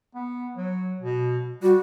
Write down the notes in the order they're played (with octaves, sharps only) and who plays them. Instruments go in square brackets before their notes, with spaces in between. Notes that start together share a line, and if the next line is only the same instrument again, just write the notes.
[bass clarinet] B3
F#3
B2
[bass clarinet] G3 [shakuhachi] F#4